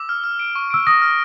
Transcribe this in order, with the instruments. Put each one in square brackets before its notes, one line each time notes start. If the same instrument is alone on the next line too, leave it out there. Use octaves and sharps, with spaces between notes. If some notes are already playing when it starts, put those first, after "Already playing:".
Already playing: [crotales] D6 [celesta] E6
[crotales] F6
F6
D7
C#6
[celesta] E6 [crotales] D7
[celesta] D#6 [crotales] A#6
[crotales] F6